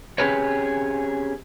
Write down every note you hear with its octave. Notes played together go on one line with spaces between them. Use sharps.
C4 C#4 G4 G#4 B4 C#5